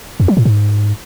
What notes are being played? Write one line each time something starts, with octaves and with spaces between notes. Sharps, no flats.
F2
F#3
A2
G#2